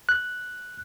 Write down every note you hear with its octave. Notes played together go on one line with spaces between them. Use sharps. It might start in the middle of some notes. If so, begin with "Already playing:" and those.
F#6